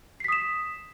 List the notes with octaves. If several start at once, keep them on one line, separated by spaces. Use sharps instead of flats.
D#6 B6 C7 E7